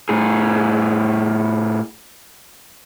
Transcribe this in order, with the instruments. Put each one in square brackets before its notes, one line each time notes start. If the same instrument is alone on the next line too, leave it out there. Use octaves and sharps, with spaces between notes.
[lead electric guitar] A2 G#4